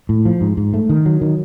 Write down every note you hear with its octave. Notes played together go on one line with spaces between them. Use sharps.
A2
F3
G#2
G#2
A3
D#3
F#3
D#3